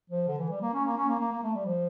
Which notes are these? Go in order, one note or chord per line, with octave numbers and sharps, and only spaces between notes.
F3
D3
E3
G3
A#3
C#4
A#3
C#4
A#3
A#3
A#3
A3
G3
F3